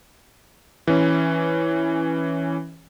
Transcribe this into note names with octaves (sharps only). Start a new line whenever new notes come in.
E3 C#4